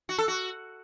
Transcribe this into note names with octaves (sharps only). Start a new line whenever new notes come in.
F#4
A4
F#4